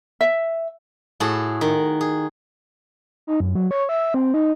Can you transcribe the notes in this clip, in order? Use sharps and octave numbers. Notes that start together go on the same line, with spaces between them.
E5
A2 F#4 G#4 A5
D#3
G#4
D#4
F#2
F#3
C#5
E5
C4
D#4